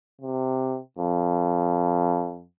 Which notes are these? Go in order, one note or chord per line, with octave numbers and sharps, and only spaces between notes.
C3
F2